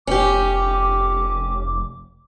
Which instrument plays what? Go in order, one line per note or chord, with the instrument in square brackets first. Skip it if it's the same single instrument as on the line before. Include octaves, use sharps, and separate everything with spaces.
[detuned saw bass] F1 [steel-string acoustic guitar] C#4 G4 [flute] D6